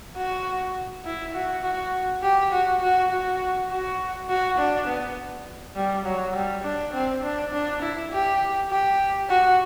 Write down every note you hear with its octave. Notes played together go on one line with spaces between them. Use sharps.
F#4
E4
F#4
F#4
G4
F#4
F#4
F#4
F#4
F#4
D4
B3
G3
F#3
G3
D4
C4
D4
D4
E4
G4
G4
F#4